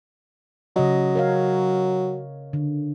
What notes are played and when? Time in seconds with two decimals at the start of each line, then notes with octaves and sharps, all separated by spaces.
0.76 C#3 F#3 D#5
1.15 A#4 C#5 F5
2.53 D3